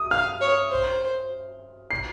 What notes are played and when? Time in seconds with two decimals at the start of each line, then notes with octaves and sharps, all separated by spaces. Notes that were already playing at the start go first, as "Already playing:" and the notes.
Already playing: D#6
0.11 F5 F6
0.41 C#5
0.71 C5
1.91 C7